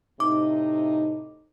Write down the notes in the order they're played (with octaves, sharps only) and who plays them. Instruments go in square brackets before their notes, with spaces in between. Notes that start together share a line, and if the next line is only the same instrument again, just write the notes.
[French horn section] A2 C3 D#4 [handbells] D6